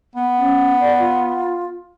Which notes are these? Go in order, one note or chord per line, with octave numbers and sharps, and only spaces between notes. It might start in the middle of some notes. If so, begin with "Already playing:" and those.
B3
C#4
D5
F4